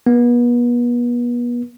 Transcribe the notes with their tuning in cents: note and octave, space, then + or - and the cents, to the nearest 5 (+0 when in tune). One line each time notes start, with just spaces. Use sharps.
B3 -35